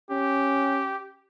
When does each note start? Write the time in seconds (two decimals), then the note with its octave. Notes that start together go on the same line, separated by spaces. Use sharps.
0.11 C#4 G4